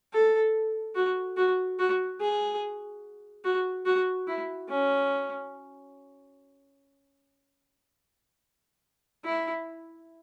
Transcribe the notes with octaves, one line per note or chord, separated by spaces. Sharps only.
A4
F#4
F#4
F#4
G#4
F#4
F#4
E4
C#4
E4